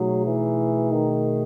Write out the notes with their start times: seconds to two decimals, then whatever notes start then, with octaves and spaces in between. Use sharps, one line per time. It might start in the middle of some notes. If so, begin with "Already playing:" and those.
Already playing: B2 F#3 A3 D#4 G#4
0.26 E3
0.92 D#3